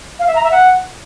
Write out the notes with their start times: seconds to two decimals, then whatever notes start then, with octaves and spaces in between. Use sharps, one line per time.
0.19 F5
0.27 E5
0.35 A#5
0.43 E5
0.51 F#5